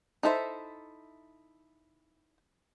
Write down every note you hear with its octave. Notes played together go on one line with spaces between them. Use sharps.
D#4 E4 A4 C5 E5